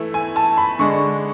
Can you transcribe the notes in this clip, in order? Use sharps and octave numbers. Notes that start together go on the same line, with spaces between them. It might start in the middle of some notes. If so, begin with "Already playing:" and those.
Already playing: E3 A3 E4
G#5
A5
B5
D3 G#3 D4 C#6